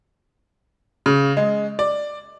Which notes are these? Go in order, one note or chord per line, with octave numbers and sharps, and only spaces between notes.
C#3
G#3
D5